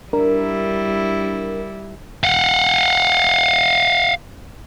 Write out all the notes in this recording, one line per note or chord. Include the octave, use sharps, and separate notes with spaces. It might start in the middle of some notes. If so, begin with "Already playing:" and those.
G3 D4 E4 A#4
F5 F#5